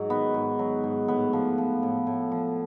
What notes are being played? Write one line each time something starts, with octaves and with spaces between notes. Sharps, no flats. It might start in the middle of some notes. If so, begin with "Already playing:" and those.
Already playing: G#2 F#3
D#3 B3
G#2
F#3
G#2
A2 B3
F3
F3
A2
A2
F3